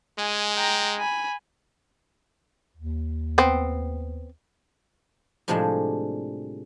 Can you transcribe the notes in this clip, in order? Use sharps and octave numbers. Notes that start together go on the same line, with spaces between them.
G#3 G#5
G5 A#5
G#5 B5
D#2
B3 C4
A2 C3 F3 G3 G#3 D4